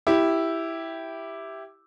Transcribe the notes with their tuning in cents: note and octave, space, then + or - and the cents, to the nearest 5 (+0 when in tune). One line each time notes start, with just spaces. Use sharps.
E4 +0 G4 +0